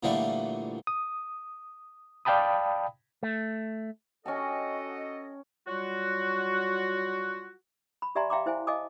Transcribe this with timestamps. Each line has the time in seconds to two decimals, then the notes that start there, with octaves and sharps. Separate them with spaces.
0.03 A#2 D3 E3 F3 G3 A3
0.87 D#6
2.25 D5 F5 G5 A5 B5 D#6
3.23 A3
4.26 C#4 F#4 A4 D#5 G5 A5
5.68 F#3 G3 F4 F#4
8.02 B5
8.15 G4 D5 E5 G#5 A#5 C6
8.30 E5 F5 G5 A#5 C6 D6
8.46 E4 C5 E5 G#5
8.67 D#5 F5 G#5 A5 D6 D#6